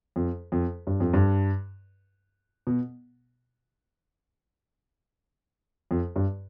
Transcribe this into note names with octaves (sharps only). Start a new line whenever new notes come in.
F2
F2
G2
F2
G2
B2
F2
G2